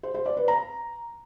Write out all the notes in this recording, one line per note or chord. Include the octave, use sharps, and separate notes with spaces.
C5
C5
D5
B4
A#5